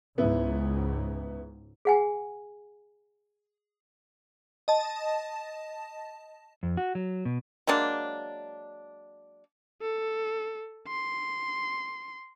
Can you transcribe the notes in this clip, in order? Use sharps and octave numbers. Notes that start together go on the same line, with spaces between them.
C#2 G#2 B3 E4
G#4 F#5 G#5
D#5 A5
F2
F#4
F#3
B2
F#3 G#3 A#3 D4
A4
C6